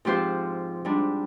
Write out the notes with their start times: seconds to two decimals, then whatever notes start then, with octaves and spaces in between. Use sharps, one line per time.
0.05 G#2 F3 C4 G4 C5
0.85 G#2 G3 D4